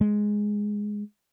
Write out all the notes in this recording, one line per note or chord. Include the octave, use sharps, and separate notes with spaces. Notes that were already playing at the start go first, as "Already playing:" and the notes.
G#3